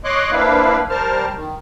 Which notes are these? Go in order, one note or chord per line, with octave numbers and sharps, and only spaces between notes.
C#5 D#5 C6 D6 F#6
A#3 C4 D4 E4 B4 F5
G3 A#4 C5 A5 F6
D#3